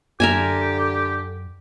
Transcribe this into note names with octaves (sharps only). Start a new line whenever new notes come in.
F#2 D3 G4 A#4 E5 G#5